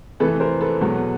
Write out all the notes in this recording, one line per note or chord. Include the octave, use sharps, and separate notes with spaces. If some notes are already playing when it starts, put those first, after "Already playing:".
F2 C3 E3 A3 A4 B4
A#4 C5
A4 B4
E2 B2 F#3